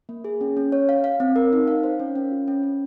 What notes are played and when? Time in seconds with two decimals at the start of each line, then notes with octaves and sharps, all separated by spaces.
0.09 A#3
0.24 G#4
0.41 C#4
0.57 C#4
0.72 C#5
0.89 F5
1.04 F5
1.20 C4
1.36 A#4
1.53 D#4
1.68 F5
1.83 C5
2.00 C#4
2.15 C#4
2.32 F4
2.48 C#4
2.63 C#4